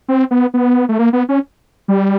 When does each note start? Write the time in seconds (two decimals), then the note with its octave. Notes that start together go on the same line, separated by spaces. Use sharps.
0.08 C4
0.31 B3
0.54 B3
0.89 A3
0.99 A#3
1.13 B3
1.29 C#4
1.88 G3